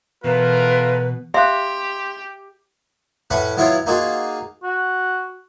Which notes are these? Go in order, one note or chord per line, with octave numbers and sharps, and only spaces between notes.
B2 E3 A3 F4 A#4 B4
G4 E5 F5 C6 F#6
A2 C#4 B4 F#5 B5 C#6
F#3 B3 E4 F4 C#5
A#3 D#4 F4 F#4 G#4
F#4